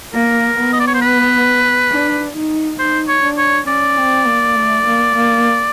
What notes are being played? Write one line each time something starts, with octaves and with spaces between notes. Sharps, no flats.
A#3 A#4
B3
D#5
D5
C#5
C5
B4
D4
D#4
D#4 C5
C#5
D4
C#5
C#4 D5
C4
A#3
A3
A#3
A#3